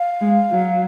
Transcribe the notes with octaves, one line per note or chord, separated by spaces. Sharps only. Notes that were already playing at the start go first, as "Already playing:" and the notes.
Already playing: F5
G#3
F#3